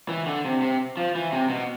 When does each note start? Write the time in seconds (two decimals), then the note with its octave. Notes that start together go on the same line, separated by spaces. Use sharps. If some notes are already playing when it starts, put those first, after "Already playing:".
0.09 E3
0.26 D3
0.45 C3
0.62 C3
0.97 F3
1.15 E3
1.32 C3
1.50 B2